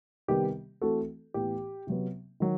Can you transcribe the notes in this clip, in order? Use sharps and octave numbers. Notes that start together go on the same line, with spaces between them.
C3 D#3 G3 B3 G4
E3 A3 C4 F#4 A4
A2 E3 B3 G4
C3 F#3 B3
D#3 F#3